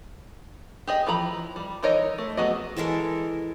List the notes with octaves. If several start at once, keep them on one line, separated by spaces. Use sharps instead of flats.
G4 G#4 D#5
E3 F3 A#5 B5
G3
E3 D#4 A#4 C#5 D#5
A3
F#3 B3 F#4 G#4 D#5
E3 G#3 A4 A#4